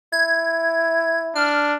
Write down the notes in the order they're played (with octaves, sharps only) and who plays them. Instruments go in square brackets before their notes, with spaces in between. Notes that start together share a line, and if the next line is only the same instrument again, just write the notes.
[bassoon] E4 [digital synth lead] G#6
[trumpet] D4 [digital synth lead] F6